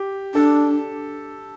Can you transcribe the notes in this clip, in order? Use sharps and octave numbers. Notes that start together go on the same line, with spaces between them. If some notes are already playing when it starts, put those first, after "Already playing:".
Already playing: G4
D4 A4